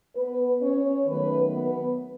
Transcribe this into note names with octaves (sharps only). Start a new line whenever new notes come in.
B3 B4
C#4 C#5
D#3 F#3 A3 B3 B4
B3 B4